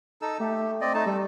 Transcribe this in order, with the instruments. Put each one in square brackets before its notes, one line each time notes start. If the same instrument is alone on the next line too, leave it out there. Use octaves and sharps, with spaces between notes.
[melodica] D#4 A4 E6
[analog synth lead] A3 [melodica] G4
[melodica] C4 D5 D#5
A3 D#4 A5
[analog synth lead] G3 [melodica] A4